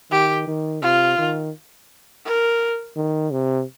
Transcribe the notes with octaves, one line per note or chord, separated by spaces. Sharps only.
D#3 G4
D#3
C3 F4
D#3
A#4
D#3
C3